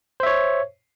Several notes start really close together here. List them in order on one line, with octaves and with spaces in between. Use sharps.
C5 E5 C#5